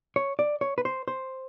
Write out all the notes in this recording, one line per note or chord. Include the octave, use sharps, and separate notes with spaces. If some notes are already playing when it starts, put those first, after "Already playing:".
C#5
D5
C#5
B4
C5
C5